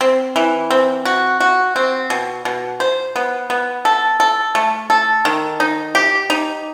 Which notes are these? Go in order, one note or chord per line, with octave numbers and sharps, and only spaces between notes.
C4
E3
C4
F#4
F#4
C4
B2
B2
C5
B3
B3
A4
A4
A3
A4
D#3
D#4
G4
D#4